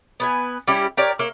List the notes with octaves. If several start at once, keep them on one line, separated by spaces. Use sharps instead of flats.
B3 B4 G#5
G3 C#4 E4 G4
G4 A#4 C#5 D5
A#3 C#5 E5